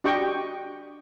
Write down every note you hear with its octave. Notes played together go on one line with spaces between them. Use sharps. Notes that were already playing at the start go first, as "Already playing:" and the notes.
D4 F#4 G4 D#5 G5 C#6